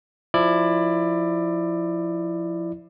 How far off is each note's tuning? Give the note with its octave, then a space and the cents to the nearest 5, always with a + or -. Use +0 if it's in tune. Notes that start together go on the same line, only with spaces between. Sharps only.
F3 +10 E4 +10 D5 +20